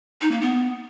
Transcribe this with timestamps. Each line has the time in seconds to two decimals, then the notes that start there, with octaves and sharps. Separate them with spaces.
0.22 D#4
0.31 A#3
0.41 B3